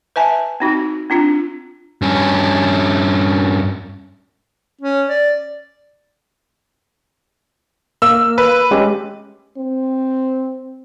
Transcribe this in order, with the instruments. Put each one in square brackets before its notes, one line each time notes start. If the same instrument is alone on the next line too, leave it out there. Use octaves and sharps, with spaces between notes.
[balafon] B4 E5 G#5 A5
C4 D#4 F#4
C4 D4 F4
[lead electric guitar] G2 C#4
[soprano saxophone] C#4
D5
[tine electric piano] A#3 [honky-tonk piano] E6
[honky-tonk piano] B4
[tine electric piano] G#3 C#4 G4
[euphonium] C4